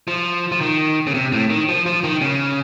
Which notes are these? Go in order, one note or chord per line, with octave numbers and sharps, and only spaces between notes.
F3
F3
D#3
C#3
C3
A2
D#3
F3
F3
D#3
C#3